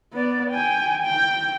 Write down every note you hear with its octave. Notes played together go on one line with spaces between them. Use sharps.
B3 D5
G5 G#5
G5